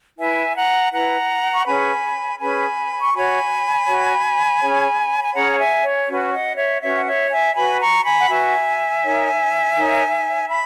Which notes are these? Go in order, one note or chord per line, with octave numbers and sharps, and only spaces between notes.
E4 B4 E5 G#5
F#5 A#5
E4 B4 F#5 A#5
C#6
C#4 G#4 B4 G#5 B5
C#4 G#4 B4 G#5 B5
C#6
F#4 C#5 G#5 B5
F#4 C#5
C#4 G#4 C#5
G#5
C#4 G#4 C#5 F#5 A#5
F#5
E5 G#5
C#5
C#4 F#4 B4
D#5 F#5
C#5 E5
C#4 F#4 B4 C#5 E5
F#5
C#5 E5
E5 G#5
F#4 B4 G#5 B5
A#5 C#6
G#5 B5
F#5
F#4 B4 E5 G#5
D#4 A#4 C#5
D#4 A#4 C#5
B5